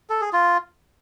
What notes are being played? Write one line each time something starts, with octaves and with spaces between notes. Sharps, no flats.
A4
G#4
F4